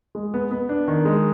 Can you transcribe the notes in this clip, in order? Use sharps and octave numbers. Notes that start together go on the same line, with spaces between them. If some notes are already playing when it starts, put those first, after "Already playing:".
G#3
B3
B3
D4
D#3
G#3